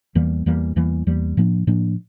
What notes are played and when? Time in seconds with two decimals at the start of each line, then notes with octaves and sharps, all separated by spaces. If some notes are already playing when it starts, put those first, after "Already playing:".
0.15 E2 E3 G3 A#3
0.46 E2 E3 G3 A#3
0.76 E2 E3 G3 A#3
1.07 E2 E3 G3 A#3
1.37 A2 F3 A#3 D4
1.67 A2 F3 A#3 D4